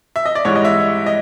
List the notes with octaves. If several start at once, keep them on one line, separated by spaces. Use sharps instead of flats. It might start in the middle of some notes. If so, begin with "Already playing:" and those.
E5
D#5
D5
G#2 E3 G3 C#5
D#5
E5
D#5